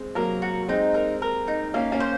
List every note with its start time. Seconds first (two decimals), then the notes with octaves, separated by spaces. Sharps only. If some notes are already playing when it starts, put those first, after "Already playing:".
Already playing: G#3 C4
0.15 F#3 A#3 A#4
0.42 F#4
0.69 G#3 C4 D#4
0.94 A#4
1.22 A#4
1.48 D#4
1.74 A#3 C#4 F5
1.92 A#3 C#4
2.00 C5